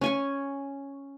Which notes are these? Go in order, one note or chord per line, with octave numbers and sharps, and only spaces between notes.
C#4 G#5 C#6